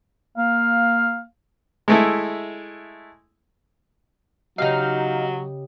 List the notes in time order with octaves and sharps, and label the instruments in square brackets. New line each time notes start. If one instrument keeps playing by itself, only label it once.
[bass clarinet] A#3 [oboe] F5
[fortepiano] G#3 A3 E4
[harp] C#3 G4 D#5 [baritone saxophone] F#3 [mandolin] D#4 F5